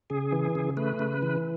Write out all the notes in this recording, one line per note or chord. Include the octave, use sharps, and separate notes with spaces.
C#3 G#4
E3
C#3
A3 B4
C#3
E3